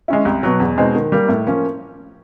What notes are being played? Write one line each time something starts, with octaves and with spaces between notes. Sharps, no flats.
G#3 C#4 E4
C2
B2 F#3
E2
B2 G#3 C4 D#4
D#3
G3 A#3
A2
F3 A#3 C#4